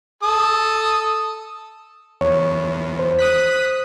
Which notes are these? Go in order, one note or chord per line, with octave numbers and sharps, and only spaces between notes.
A4 D#6
E2 C#5
C5
D#6 F#6 B6